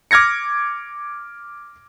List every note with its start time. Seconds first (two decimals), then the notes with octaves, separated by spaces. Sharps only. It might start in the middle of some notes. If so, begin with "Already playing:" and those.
0.11 D6 F6 G#6 A#6 C#7